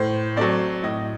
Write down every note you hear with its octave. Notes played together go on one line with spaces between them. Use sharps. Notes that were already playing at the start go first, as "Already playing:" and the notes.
Already playing: A2 C5
F#3 A3 C4 D5
A2 D#5